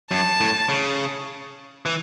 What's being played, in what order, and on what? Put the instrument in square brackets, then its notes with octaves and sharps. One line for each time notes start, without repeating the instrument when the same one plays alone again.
[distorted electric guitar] F#2 [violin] A5
[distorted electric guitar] A2
C#3
E3